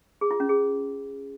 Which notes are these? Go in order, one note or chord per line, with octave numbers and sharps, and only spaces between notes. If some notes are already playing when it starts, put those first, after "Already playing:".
G#4
F4
C#4
G#4